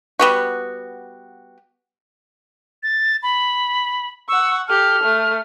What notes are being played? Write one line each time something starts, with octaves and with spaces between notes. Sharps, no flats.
G3 B3 F#4
A6
B5
F#5 C#6 E6
G4 A4 F6
A3